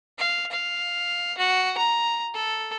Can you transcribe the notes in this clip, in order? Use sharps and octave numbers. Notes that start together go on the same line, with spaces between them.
F5
F5
F#4
A#5
A4